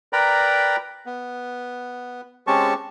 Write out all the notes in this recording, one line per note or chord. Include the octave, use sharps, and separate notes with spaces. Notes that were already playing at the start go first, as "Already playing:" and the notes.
A#4 B4 D5 G5 A#5 B5
B3
G#3 C4 C#4 G4 A5 C#6